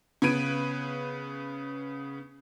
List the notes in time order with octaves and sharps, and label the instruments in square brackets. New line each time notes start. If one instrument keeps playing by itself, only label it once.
[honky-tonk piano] C#3 B3 B4 G#6 D7 D#7